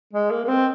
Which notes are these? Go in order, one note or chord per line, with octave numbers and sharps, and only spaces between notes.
G#3
A#3
A#3
C4